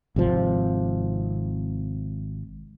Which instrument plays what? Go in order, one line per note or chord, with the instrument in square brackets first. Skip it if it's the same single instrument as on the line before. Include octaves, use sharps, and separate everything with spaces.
[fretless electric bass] G#1 C3 F3